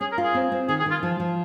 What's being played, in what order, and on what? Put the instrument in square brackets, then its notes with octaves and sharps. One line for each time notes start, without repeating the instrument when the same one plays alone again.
[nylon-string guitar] C#4 [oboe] G#4
[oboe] A#4
[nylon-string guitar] F4
[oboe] G#4
[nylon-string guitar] C4
C4
[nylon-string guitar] D#3 [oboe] G#4
[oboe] G#4
[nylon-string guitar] D#3 [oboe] F4
[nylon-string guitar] F3
F3